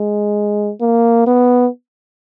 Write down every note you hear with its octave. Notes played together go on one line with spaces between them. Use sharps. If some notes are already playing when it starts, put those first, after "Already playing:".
Already playing: G#3
A#3
B3